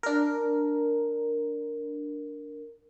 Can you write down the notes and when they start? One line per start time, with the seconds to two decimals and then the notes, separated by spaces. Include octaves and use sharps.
0.03 D4 A#4